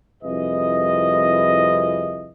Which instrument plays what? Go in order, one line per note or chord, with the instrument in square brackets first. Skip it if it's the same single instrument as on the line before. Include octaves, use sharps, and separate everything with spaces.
[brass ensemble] C2 F2 E4 G#4 B4 D#5